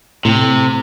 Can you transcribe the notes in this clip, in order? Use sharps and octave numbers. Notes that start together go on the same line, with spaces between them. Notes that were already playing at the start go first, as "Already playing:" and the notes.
A2 C3